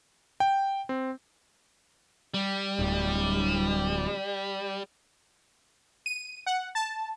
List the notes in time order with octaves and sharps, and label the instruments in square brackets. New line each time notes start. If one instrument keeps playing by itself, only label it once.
[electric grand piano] G5
C4
[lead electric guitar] G3
[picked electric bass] D1
[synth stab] D#7
F#5
A5